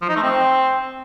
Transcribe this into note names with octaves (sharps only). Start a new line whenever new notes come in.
F3
D#4
A3
C4